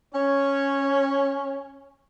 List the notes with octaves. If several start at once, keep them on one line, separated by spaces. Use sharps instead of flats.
C#4 C#5